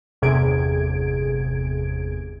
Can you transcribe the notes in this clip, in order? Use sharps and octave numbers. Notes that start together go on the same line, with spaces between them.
G1 E2 C3 G#4 G#6 D7